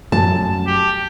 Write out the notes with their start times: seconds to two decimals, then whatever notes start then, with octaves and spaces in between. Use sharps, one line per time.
0.12 F#2 A3 A5
0.67 G4